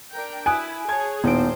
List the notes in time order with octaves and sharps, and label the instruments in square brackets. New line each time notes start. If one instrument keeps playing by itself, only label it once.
[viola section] D4 A#4 G5
[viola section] E4 [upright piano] G#5 [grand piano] D#6 F#6 D7
[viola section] G#4 C#5 [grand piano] A5 G#6
[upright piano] D#1 [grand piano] A2 D#4 D7 [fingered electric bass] B3 [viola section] C5